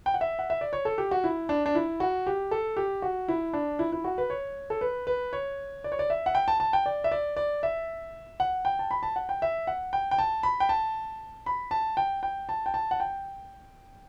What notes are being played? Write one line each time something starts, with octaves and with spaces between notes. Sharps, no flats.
G5
F#5
E5
F#5
E5
D5
C#5
A4
G4
F#4
E4
D4
D4
E4
F#4
G4
A4
G4
F#4
E4
D4
E4
E4
F#4
B4
C#5
A4
B4
B4
C#5
D5
C#5
D5
E5
F#5
G5
A5
A5
G5
D5
E5
D5
D5
E5
F#5
G5
A5
B5
A5
F#5
G5
E5
F#5
G5
G5
A5
B5
G5
A5
B5
A5
G5
G5
A5
G5
A5
F#5
G5